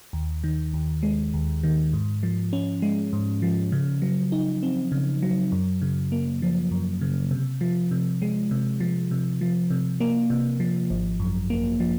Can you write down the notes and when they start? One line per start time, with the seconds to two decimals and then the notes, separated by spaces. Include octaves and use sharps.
0.13 D#2
0.44 D#3
0.74 D#2
1.03 G#3
1.34 D#2
1.63 D#3
1.93 G#2
2.23 F3
2.53 C#4
2.82 G#3
3.13 G#2
3.42 F3
3.72 C#3
4.02 F#3
4.32 D#4
4.63 C4
4.92 C#3
5.22 F#3
5.52 F#2
5.82 C#3
6.12 A#3
6.42 F3
6.71 F#2
7.01 C#3
7.31 C3
7.61 F3
7.91 C3
8.22 G#3
8.51 C3
8.80 F3
9.11 C3
9.41 F3
9.70 C3
10.00 A#3
10.30 C3
10.60 F3
10.90 G#1
11.20 F#2
11.50 A#3
11.80 F3